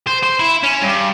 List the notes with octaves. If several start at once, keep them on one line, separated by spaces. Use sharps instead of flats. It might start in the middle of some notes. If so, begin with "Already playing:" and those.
C5
C5
E4
C#4
G2